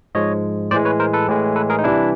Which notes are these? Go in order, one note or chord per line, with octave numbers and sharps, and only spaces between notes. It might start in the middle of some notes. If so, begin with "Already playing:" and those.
G#2 F3 G#3 C#5 D#5
A2 E3 G#3 C5 D5
B4 C#5
A#4 C5
A4 B4
A2 E3 G#3
A4 B4
G#4 A#4
D#4
C3 E3 G3 D4 E4